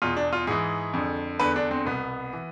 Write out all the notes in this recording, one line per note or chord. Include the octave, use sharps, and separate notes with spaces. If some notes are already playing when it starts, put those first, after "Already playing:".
E2 B2 F4
D4
F4
G#2 E3 G#4
F2 D3
E2 D3 B4
D4
C4
C2 B2 B3
E3